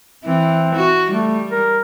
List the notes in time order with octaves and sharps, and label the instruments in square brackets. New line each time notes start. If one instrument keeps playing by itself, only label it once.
[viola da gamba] E3 [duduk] C4
[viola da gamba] F#4
[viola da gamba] G3 [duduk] A3
[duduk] A#4